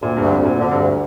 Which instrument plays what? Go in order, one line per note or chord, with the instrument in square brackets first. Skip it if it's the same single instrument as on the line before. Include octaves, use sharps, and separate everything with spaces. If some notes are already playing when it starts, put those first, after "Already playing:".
[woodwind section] D2 [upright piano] A#2
[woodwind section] D2 [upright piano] G2
[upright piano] F2
[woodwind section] D2 [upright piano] A#2
[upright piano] F2 [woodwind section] D3
[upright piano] G2
[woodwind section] D2